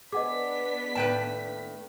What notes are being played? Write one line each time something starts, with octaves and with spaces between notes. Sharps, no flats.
B3 D4 G#4 B4 D#5 F#5 D6 B6
D#2 A2 B4 G5 A5